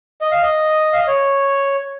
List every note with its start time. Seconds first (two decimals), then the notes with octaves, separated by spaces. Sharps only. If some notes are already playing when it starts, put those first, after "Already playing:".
0.21 D#5
0.31 F5
0.43 D#5
0.93 F5
0.99 D#5
1.07 C#5